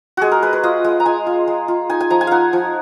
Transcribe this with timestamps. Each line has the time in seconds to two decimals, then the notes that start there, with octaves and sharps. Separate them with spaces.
0.17 G#3 F#4 G#4
0.32 A#4
0.43 G#3 B4
0.53 B4
0.63 F4 D#5
0.84 G#3
1.00 A#5
1.05 F4 G#5
1.27 F4
1.48 G#3
1.68 F4
1.90 D#4 G#5
2.01 G#5
2.10 F3 A#5
2.21 G#5
2.27 D#4 F5 F#5
2.53 F3